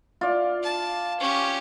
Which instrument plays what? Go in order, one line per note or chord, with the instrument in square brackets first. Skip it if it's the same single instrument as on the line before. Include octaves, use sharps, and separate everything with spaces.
[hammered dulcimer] F4 D5
[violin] A5
C#4 G4